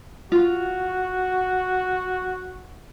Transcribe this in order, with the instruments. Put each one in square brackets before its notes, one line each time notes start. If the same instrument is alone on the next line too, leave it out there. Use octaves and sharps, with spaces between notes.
[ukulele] F4 [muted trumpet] F#4